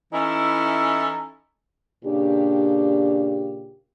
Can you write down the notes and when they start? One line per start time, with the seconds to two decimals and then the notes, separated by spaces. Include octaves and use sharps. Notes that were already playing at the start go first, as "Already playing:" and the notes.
0.13 E3 C#4 D#4 E4 A4 E5
2.05 A#2 C#3 D4 G4